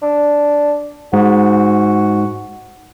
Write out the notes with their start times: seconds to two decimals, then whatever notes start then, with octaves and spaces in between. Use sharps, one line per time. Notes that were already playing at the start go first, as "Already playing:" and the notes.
0.02 D4
1.13 G#2 F#4